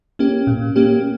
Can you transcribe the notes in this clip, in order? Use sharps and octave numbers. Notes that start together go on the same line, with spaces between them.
A#3 C#4 G4
A#2
A#3 C#4 G4